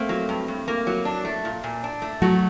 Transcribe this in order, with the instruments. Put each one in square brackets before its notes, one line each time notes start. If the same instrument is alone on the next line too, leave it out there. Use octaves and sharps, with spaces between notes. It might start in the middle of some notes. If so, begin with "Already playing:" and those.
Already playing: [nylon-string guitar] A3 C4 [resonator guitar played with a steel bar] A#3
[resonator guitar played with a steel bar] F#3
G2
G2
A#3
F#3
D4
A3
A#2
A#2
D4
A3
[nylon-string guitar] F#3 A3 [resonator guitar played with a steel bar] F#4